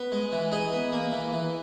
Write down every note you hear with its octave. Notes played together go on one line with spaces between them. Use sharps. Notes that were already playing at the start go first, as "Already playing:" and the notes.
Already playing: B3
G#3
E3
D#4 G#4
B3
A#3
E3
E3